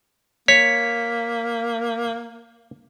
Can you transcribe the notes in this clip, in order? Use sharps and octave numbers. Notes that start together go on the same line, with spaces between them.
A#3 C#5 B6